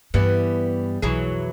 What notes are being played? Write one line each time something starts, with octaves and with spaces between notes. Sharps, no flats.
G2 E3 G3 B3
B1 F2 E3 F#3 G#4